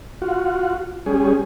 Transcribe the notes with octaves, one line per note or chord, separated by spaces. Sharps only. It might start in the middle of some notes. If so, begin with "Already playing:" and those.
F4 F#4
G3 C#4 G#4